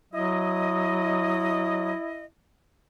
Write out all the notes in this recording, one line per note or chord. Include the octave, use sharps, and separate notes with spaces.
F#3 E4 D#5